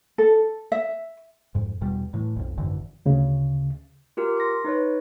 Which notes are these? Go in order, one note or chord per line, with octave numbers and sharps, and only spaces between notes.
A4
E5
F2 G#2
E2 B2 G3
A2 E3
B1 F2
G#1 F#2 D3 E3
D2 C#3
F4 G4 A#4
C6 A#6
D#4 B4 C#5